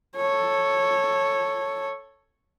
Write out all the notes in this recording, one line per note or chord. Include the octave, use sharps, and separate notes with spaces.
A4 C#5